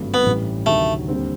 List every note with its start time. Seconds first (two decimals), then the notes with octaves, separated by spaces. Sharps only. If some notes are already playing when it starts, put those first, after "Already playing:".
Already playing: G#1 G2 D3 F#3 A3
0.14 B3
0.24 A1 A2 E3 G3
0.66 D2 C3 D#3 F#3 A3
1.08 D#2 D3 G3 C4